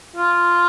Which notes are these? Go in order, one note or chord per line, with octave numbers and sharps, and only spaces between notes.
F4